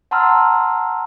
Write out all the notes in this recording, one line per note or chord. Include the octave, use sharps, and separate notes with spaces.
F#5 A5 A#5 C6 E6 F6